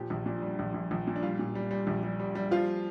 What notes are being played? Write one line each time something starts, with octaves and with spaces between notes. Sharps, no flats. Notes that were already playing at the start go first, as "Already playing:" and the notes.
Already playing: A#2 F3 G4
A#1
A#2 D4
G3
A#1
A#1
A#1
A#2
D4
G3 F4
A#2
G3
G3
A#1
G3
G3
G3
F3 F4